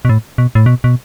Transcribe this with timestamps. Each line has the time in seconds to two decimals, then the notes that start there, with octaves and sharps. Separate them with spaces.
0.05 B2
0.09 A2
0.38 B2
0.55 A2
0.66 B2
0.84 B2